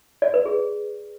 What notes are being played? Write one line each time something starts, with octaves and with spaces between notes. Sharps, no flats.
D5
B4
G#4